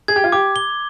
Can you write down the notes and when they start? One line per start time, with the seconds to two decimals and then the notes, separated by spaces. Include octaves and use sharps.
0.08 G#4 G#6
0.16 G4
0.24 F4
0.32 G4 D6
0.56 G7